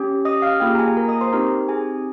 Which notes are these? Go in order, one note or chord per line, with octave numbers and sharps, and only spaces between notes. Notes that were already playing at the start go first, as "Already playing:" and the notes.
Already playing: C#4 G4
D#5 D#6
F5 F6
A#3 F4 G4 G#4 G5
A#5
G#4 G#5
A#4 A#5
D#5 D#6
C5 C6
C4 D#4 G4 A#4 A#5
G#4 G#5